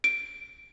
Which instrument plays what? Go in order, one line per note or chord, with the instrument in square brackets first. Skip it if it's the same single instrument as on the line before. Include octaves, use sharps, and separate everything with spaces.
[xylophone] D7